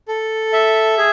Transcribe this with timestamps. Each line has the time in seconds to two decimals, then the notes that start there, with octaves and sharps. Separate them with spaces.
0.08 A4
0.53 E5
0.98 G#4